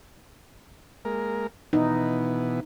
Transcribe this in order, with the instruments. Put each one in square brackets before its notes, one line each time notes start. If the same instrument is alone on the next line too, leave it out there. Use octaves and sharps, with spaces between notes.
[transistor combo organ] G#3 A#3 A#4
[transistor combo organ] B2 E3 B3 [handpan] D#4